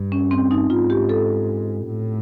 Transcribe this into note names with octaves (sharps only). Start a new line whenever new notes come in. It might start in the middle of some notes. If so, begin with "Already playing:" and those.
Already playing: G2
C#4
C4
D#4
G#2 F4
G4
A4
A2